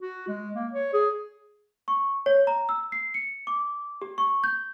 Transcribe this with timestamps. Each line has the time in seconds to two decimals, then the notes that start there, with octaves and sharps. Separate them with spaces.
0.02 F#4
0.28 G#3
0.54 A#3
0.73 C#5
0.94 G#4
1.88 C#6
2.26 C#5
2.47 A#5
2.69 E6
2.92 C7
3.14 C#7
3.47 D6
4.02 G4
4.18 C#6
4.44 G6